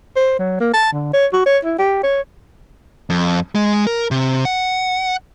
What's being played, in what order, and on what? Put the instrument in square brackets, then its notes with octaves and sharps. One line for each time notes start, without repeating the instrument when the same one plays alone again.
[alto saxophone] C5
F#3
A#3
A5
D3
C#5
F#4
C#5
E4
G4
C#5
[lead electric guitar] F2
G#3
A#4
C3
F#5